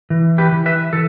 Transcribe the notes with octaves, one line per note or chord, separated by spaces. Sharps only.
E3
G4 B4
E3
B4 E5
E3 A4